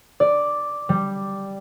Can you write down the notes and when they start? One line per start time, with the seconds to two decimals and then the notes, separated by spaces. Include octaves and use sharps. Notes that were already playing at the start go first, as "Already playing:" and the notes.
0.20 D5
0.89 G3